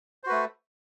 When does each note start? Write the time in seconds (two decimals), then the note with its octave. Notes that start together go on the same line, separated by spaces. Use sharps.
0.24 C5
0.26 F#4
0.29 B4
0.32 A3